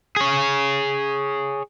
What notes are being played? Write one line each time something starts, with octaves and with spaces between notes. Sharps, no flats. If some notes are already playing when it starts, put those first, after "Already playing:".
G#4 C#5